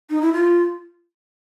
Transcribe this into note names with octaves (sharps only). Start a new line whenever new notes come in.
D#4
E4
F4